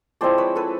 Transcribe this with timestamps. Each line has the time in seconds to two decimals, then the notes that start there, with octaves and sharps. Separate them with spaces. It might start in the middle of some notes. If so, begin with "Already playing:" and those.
0.21 F3 G#3 C4 E4 C5 D5
0.38 B4 C#5
0.56 A4 B4